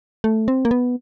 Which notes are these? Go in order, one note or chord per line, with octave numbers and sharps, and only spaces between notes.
A3
C4
A#3
B3